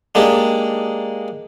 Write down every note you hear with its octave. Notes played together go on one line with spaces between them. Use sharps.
G#3 A#3 D4 D#4 G4